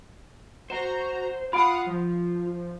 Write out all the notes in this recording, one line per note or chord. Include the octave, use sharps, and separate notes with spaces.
F#4 C5 A#5 E7
F4 F5 F#5 B5 D#6 D7
F3